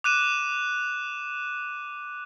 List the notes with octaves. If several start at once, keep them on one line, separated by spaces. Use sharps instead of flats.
D6 F#6 D#7 E7